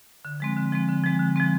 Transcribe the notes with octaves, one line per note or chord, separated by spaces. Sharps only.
D3
F3 G#3 C4
D3
F3 G#3 C4
D3
F3 G#3 C4
D3
F3 G#3 C4